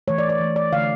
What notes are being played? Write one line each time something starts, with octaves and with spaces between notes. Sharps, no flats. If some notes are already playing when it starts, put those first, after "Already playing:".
E3 A3 C#5
D5
D5
E3 A3
D5
D3 A3 F5